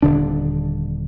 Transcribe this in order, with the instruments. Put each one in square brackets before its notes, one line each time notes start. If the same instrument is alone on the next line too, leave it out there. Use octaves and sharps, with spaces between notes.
[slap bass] D#1 D3 D4